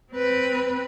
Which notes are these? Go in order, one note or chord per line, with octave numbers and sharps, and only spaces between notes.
C4 B4